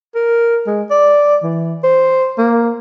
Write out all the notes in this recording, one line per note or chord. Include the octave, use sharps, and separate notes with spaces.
A#4
G#3
D5
E3
C5
A#3